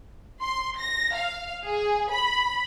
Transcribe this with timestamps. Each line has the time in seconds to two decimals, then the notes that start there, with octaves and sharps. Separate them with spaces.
0.42 C6
0.78 A#6
1.15 F5
1.66 G#4
2.12 B5